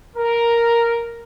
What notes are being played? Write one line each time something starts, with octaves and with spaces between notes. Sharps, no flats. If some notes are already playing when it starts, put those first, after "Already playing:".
A#4